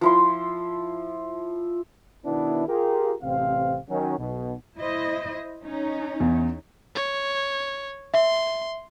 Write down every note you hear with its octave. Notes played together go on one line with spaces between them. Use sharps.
F3 E4 C6
B2 D#3 B3 D4 E4
F4 G4 G#4 A#4
A1 C3 C4 F5
D#3 F#3 C#4
B1 B2
E4 C5 D#5
C#4 D#4
E2
C#5
E5 C6